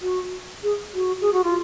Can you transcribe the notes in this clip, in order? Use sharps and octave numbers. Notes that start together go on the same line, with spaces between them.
F#4
G#4
F#4
G#4
F#4
F4